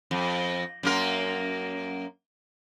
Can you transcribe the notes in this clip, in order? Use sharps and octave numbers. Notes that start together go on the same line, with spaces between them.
F2
F#2 A#3 A#4